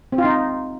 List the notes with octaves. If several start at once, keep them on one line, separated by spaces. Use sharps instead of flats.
C4
F4
D#4